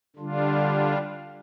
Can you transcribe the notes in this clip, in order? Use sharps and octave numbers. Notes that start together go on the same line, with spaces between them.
D3 G3 D4 F4